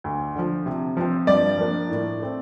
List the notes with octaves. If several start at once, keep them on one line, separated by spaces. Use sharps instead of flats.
D2
D3 F3
C3
F3 C4
G2 D5
F3 A#3 D4
A2
A3 C4